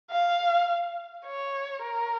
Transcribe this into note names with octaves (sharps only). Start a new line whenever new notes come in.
F5
C#5
A#4